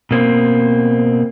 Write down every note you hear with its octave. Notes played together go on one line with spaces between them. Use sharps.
B2 A#3 C4